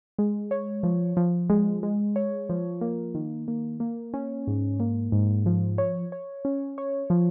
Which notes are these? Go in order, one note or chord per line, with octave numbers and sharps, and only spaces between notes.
G#3
C#5
F3
F3
G#3
G#3
C#5
F3
A#3
D#3
A#3
A#3
C#4
G#2
A#3
G#2
F3
C#5
C#5
C#4
C#5
F3